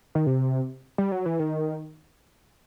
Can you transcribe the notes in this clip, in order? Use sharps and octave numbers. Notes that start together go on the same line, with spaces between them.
D#3
C3
G3
F#3
E3
D#3